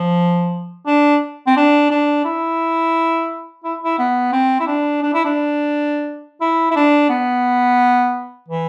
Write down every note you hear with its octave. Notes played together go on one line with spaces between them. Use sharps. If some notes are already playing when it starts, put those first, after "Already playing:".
Already playing: F3
D4
C4
D4
D4
E4
E4
E4
B3
C4
E4
D4
D4
E4
D4
E4
E4
D4
B3
E3